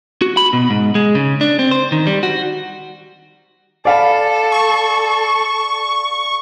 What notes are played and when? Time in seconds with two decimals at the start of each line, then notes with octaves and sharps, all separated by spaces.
0.22 F#4
0.37 B5
0.53 B2
0.70 G#2
0.95 G#3
1.15 C#3
1.41 D4
1.59 C4
1.71 C5
1.92 D#3
2.07 G3
2.23 F#4
3.85 A4 D5 F5 B5
4.52 C#6